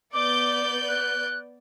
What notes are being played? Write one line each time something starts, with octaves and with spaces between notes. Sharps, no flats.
B3 D5 D6 G6
F#6